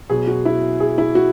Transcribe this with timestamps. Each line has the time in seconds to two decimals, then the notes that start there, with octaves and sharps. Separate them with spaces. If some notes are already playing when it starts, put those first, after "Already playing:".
0.09 B2 F#3 G#4
0.27 F#4
0.45 E4
0.80 G#4
0.98 E4
1.15 F#4